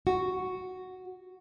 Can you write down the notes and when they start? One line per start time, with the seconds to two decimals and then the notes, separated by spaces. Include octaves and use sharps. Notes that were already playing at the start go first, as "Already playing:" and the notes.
0.07 F#4